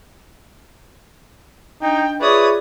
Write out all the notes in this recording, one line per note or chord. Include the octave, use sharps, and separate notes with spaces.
D4 D#4 D#5 G5
F4 G#4 B4 C#5 D5 E5 D#6